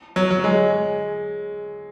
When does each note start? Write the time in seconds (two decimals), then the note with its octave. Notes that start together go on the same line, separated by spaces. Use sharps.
0.16 F#3
0.30 F#3
0.44 G#3